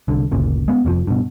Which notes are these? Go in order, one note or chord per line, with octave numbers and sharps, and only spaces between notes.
C2 D3
G1 D2 A#2 C#3
G#3 B3
F1 F2 C3 F3
G2 B2